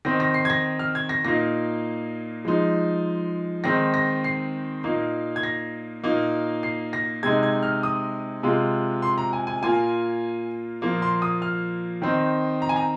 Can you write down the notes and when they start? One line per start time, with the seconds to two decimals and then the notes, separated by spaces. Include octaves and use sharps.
0.05 D#3 C4 D#4 A#6
0.20 A#6
0.34 C7
0.45 G#6
0.50 A#6
0.79 F6
0.95 G#6
1.09 A#6
1.24 A#2 A#3 D#4 A#6
2.45 F3 G#3 D#4
3.64 D#3 G#3 C4 D#4 A#6
3.94 A#6
4.24 C7
4.84 A#2 A#3 D#4
5.36 G#6
5.43 A#6
6.04 A#2 A#3 D#4
6.63 C7
6.93 A#6
7.23 C3 G#3 D#4 G#6
7.43 G#6
7.63 F6
7.83 D#6
8.43 C3 G#3 F4
9.02 C6
9.18 A#5
9.33 G#5
9.47 G#5
9.62 A#2 A#3 F4 G#5
10.82 A#2 F3 A#3
11.02 C6
11.22 D#6
11.42 F6
12.02 D#3 C4 D#4
12.62 A#5
12.69 G#5
12.76 A#5